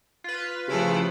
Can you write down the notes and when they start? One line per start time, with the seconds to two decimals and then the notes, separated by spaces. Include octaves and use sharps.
0.24 F4 B4
0.68 C#3 F3 A3 E4 G4